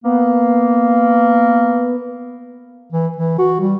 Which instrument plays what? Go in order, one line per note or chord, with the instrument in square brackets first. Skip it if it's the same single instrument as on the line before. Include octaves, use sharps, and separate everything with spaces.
[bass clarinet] A#3 [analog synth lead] B3
[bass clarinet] E3
E3
F#4
G3